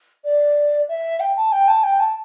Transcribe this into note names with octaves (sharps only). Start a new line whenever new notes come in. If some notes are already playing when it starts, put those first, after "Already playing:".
D5
E5
G5
A5
G5
A5
G5
A5